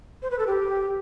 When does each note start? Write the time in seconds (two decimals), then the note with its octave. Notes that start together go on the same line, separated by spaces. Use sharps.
0.22 C5
0.31 B4
0.39 A4
0.47 G4